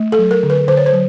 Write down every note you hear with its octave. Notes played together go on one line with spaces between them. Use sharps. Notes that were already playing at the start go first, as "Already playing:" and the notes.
Already playing: A3
A4
F#3
A#4
D3
B4
D3 C5
C#5
C5
F#3